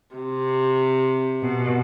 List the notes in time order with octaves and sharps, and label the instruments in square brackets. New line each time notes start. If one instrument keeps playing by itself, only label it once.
[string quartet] C3
B2